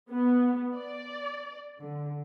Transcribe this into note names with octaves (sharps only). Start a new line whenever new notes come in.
B3
D5
D3